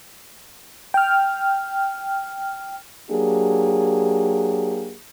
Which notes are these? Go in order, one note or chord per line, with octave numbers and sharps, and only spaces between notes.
G5 F6
F#3 A#3 D4 G4 G#4